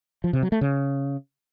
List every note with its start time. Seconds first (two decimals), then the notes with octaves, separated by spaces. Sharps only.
0.24 F3
0.33 C3
0.43 F#3
0.52 A3
0.61 C#3